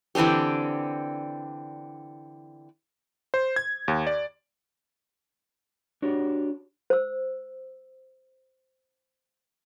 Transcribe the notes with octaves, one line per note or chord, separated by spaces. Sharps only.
D3 E3 C4 D4 G4
C5
G#6
D#2
D5
D4 F#4 G4 C#5
C5 E6